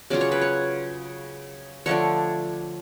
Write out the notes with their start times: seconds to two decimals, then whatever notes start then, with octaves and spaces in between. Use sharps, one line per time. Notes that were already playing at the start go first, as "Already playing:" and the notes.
0.10 C#3 F#3 C#4 F4 D5
0.21 C#5
0.32 B4
0.41 C#5
1.86 D3 F3 A3 D4 C#5